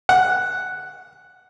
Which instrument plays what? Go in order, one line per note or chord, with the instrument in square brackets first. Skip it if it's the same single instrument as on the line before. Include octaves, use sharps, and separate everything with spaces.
[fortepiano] F#5